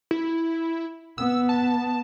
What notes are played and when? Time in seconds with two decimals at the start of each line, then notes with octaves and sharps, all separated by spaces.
0.11 E4
1.18 B3 E6
1.49 A5